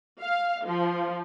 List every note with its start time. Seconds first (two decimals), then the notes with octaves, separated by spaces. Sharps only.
0.21 F5
0.66 F3